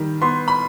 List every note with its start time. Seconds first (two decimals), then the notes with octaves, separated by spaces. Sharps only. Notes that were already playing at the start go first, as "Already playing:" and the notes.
Already playing: D#3 G3
0.22 B3 C6
0.48 B5